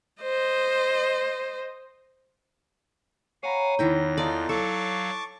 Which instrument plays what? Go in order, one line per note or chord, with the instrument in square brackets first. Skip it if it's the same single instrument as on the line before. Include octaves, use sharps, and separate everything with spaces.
[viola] C5 D#5
[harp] C#5 A#5 B5 [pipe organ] F5 F#5 G#5
[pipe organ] E2 A#6 [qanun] D#3 E4 G5
[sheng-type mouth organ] D#4 F4 A4 [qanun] D5
[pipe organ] F#3 F5 [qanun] A4 [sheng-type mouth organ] A5 C#6 D6